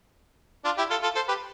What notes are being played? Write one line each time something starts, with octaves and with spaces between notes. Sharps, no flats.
D4 F4
E4 G4
F4 A4
F4 A4
A4 C5
G4 B4